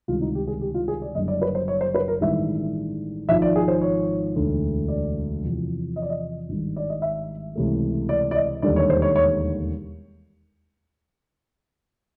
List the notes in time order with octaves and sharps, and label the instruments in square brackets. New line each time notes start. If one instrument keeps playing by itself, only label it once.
[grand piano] C#2 C3 D#3 G3 F4
D#4
G4
G#4
G4
F4
G#4
D5
F#1 F#2 D3 G3 D#5
D5
B4
C5
C#5
C5
B4
A#4
A1 G2 D#3 G#3 E5
G#1 G#2 F3 E5
D5
G#4
C5
C#5
E1 D2 D3
D5
E2 C3 F3
D#5
D5
D#5
G#1 G2 D#3 G3
D5
D#5
E5
C#2 C3 E3 A3
D5
D5
D#5
E1 D#2 D3 G3 D5
C#5
C5
C#5
C#5